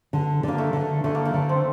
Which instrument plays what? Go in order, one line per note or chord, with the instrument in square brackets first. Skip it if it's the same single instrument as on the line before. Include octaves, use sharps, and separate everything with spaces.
[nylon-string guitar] D3
[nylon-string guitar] D3 [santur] A#3
[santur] A3
[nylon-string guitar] D3
[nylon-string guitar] D3 [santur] A3
[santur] A#3
A3
[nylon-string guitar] D3
[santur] C4